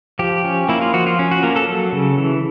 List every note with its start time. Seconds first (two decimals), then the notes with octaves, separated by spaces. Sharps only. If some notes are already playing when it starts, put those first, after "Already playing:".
0.19 F3 G4
0.45 C#4
0.69 A#3 E4
0.81 F4
0.93 F3 F#4
1.07 F4
1.19 C#4
1.31 F#4
1.43 A#3 A#4
1.56 A4
1.69 F#3
1.92 C#3
2.18 E3